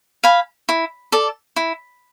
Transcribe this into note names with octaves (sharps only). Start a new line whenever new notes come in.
F5 G#5 B5
E4
A4 D5
E4